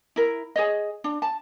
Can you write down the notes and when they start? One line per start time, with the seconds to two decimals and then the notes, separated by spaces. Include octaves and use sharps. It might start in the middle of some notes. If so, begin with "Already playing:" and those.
0.16 E4 A#4
0.56 G#4 C#5 D#5
1.04 D4
1.22 A5